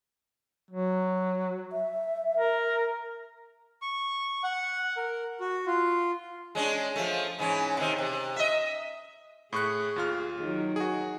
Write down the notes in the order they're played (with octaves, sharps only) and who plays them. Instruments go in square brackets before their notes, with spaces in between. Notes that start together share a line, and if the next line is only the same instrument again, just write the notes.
[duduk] F#3
[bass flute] E5
[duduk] A#4
[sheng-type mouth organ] C#6
F#5
A#4
F#4
F4
[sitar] G#3 C#4 D4
F3 A3
G#2 E3 C#4
C3 D#3
C3
D#5 E5
[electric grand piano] A2 C#6 F#6 [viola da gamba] G#4
[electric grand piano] D#2 F4 F6
[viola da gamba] D#3 F#3
[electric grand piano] F#4 G#4